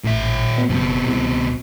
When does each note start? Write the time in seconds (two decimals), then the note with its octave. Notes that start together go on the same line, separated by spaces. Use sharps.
0.04 A1 A#2 E5
0.58 B2
0.70 F#1 B2 C4
1.07 C2